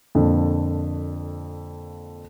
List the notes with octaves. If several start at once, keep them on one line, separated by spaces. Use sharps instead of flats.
F2 A#2 D3